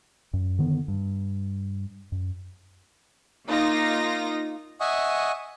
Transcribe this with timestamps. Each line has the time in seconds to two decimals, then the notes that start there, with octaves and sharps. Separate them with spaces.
0.33 F#2
0.59 D3 D#3 B3
0.88 G2
2.12 F#2
3.47 A#3 D#4 F4 A#6
4.80 D#5 E5 F#5 G#5 C#6 D#6